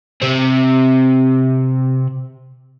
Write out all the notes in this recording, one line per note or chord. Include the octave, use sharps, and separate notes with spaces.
C3 C4